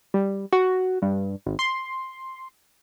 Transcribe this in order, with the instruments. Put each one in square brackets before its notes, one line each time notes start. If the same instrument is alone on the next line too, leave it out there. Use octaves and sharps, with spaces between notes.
[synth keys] G3
F#4
G2
G#1
C6